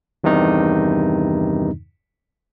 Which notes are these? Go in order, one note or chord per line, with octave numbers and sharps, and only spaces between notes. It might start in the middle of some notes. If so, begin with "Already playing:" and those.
E2 G2 C3 D#3 D#4